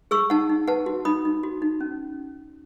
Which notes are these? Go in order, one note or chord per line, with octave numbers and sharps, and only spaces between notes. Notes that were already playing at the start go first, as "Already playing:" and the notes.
G#4 C#6 E6
D#4 F#5 A5
D#4
B4 F#5 A5
F#4
D#4 B5 D#6
D#4
F#4
D#4
C#4